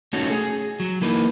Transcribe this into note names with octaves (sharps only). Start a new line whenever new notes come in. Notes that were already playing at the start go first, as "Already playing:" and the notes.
A3 C#4 D#4 F#4 A4 C#5
G#4
F#3
E3 A3 A#3 D#4 B4